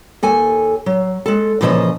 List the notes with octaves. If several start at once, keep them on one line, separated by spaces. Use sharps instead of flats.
D#2 A4 G#5
F#3
G#3 A4
A#2 C#3 E3 F3 D#5 A5